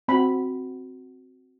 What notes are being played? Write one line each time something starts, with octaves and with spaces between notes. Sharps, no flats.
C4 F#4 B5